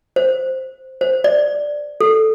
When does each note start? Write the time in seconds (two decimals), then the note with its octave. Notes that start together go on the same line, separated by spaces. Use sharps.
0.16 C5
1.01 C5
1.24 D5
2.01 A4